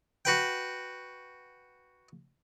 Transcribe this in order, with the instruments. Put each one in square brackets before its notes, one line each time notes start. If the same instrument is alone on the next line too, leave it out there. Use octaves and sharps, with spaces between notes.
[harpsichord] F#4 B4 G5